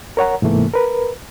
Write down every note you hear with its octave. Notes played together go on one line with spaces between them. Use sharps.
A#4 C#5 F#5 A#5
G#2 C3 E3 A3 A#3
A#4 B4